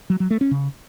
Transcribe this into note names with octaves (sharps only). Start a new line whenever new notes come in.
F#3
F#3
A3
C#4
C#3